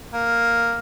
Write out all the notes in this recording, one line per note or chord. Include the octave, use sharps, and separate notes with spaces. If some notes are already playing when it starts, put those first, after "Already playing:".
A#3